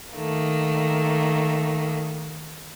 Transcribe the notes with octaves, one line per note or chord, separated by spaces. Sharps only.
D#3 A3 A#3